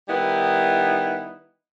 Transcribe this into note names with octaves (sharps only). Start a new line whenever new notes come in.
D#3 G3 B3 D#4 E4